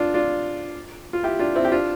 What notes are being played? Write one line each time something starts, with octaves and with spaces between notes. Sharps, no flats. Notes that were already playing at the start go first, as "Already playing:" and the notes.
Already playing: D4 F4
D4 F4
F4
E4 G4
D4 F4
C4 E4
G4
D4 F4